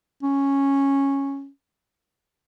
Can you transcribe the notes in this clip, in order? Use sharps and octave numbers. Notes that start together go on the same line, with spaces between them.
C#4